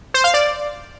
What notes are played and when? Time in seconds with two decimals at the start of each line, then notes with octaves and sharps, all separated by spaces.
0.14 C5
0.24 F5
0.34 D5